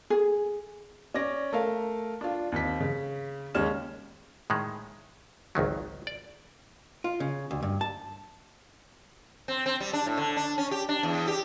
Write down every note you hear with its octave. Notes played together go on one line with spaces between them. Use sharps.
G#4
C#4 D5 D6 A#6
A3 A#4 F5
D4 F4
D#2 C4 B6
C#3
D#2 G#3 C#4 F6 E7
A2 D#3 G#3
G#1 C#2 D#3 F#3
D5
F4
C#3
D2
G2
A5
C4
C4
G3
D4
A2
D3
D4
C#4
G4
D4
E2
G4